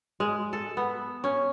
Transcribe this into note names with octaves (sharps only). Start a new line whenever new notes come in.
G#3
A4
B3
C#4